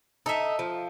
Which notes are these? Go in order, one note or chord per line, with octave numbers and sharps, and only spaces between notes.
D#4 A4 E5
F3